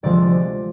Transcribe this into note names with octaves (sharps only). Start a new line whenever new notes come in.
D2 C3 F3 G#3 D5